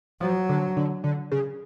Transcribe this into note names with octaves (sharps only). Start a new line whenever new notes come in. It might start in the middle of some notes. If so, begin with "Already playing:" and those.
F3 F#3
D3
D3
D3
C#3